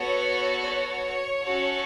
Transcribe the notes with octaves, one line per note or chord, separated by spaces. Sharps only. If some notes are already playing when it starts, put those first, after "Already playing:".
Already playing: B3 F#4 A4 C#5
C#5
C#4 F#4 A4